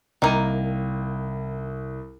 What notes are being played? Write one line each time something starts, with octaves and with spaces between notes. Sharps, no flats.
C2 D#3 A#3 D#7